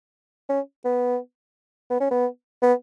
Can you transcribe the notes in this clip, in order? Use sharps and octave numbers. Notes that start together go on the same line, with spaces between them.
C#4
B3
B3
C#4
B3
B3